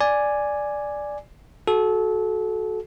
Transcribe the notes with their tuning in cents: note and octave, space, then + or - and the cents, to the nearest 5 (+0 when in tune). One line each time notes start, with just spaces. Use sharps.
D5 +0 G#5 +0
F#4 +0 A4 -25